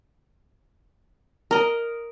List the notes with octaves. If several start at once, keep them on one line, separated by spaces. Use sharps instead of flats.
A#4 D#5